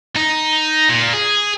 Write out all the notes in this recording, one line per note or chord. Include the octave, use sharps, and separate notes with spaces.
D#4
A#2
G#4